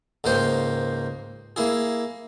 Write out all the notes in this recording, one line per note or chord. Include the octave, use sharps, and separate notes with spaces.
C#2 G#2 A#3 C5 G5
A#3 E4 G#4